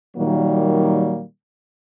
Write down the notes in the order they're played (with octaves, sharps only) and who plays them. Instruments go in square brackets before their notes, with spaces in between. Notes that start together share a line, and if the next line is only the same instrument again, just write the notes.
[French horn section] A#2 D#3 F#3 G3 A#3